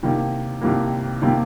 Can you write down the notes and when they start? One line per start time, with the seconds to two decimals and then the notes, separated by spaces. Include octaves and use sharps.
0.03 C2 C3 D#3 G3 A#3
0.61 C2 C3 D#3 G3 A#3
1.22 C3 D#3 G3 A#3